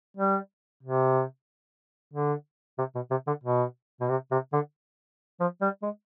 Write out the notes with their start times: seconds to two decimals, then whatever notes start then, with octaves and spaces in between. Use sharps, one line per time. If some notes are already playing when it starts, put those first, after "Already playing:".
0.17 G3
0.83 C3
2.14 D3
2.79 C3
2.95 B2
3.11 C3
3.27 D3
3.44 B2
4.01 B2
4.09 C3
4.31 C3
4.53 D3
5.40 F3
5.62 G3
5.83 G#3